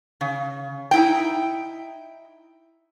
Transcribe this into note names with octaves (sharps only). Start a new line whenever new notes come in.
C#3
D#4 E4 G5